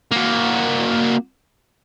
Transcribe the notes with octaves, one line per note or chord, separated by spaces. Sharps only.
A#3 F#4